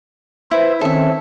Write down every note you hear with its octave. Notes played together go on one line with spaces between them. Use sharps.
E4 B4 C5 E5
D#3 C4 C#4 A4 E5